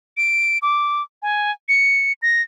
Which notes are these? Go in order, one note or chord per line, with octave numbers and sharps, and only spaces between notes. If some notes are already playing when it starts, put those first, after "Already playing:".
D7
D6
G#5
C#7
A#6